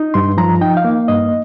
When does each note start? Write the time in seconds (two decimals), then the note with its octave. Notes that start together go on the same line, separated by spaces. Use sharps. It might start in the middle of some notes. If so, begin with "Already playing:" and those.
Already playing: D#4
0.14 G2 C6
0.37 F3 A#5
0.61 D#4 G5
0.77 F5
0.85 A#3
1.08 G2 D#5